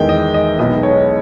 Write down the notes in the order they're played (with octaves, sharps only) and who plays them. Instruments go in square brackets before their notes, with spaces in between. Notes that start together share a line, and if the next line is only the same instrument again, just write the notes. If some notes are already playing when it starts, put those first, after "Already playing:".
Already playing: [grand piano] E2 D#3 G#3 G5
D#5
D#5
B1 B2 G#3 D#5
C#5